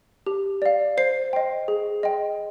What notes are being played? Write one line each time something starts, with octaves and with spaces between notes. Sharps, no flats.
G4
D5 F5
C5 C7
D#5 G5
G#4
D#5 G5